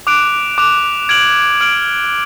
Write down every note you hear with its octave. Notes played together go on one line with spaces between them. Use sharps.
D6 F#6 D7 F7
D6 F#6 D7 F7
F6 G#6 D7 F#7
F6 G#6 D7 F#7